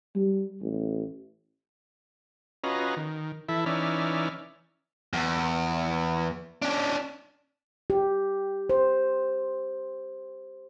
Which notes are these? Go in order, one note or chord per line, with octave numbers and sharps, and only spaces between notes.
G3
A1
C#4 F4 F#4 B4 D#5 A#5
D#3
E3 E4 A4 E5
E3 C#4 D#4 D5 E5 F6
E2
C#4 D4
G4
C5